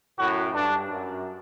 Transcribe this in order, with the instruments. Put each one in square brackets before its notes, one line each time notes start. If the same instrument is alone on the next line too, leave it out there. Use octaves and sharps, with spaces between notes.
[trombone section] F#2 A2 [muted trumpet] F#4
[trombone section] G2 [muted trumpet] D4
[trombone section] F#2